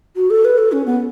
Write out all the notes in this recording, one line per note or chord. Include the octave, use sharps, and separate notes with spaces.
F#4
A4
B4
A4
C#4
B3